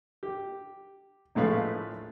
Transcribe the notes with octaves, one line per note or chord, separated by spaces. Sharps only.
G4
A#1 A2 G#3 A3 B4 F5